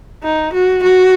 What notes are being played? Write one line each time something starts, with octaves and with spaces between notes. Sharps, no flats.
D#4
F#4
F#4